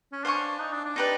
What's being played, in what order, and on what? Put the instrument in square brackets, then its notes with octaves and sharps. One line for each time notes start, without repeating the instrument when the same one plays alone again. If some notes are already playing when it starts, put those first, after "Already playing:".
[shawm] C#4
[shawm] D4 [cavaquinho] C5 F5 G#5 C#6
[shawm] D#4
D4
D4
[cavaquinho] D#4 G4 B4 D5